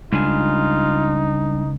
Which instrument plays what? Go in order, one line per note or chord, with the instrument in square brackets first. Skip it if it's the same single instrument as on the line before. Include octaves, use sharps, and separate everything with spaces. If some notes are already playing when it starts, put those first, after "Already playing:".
[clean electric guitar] C#2 [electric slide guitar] G3 D4 G#5 [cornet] D#4 [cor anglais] F4